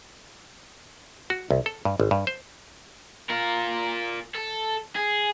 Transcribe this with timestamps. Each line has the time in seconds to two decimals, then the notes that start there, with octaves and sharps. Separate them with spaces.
1.30 F#4
1.51 C2
1.66 A4
1.85 G2
2.00 G#1
2.11 G2
2.27 C5
3.29 F4 A#4
4.35 A4
4.95 G#4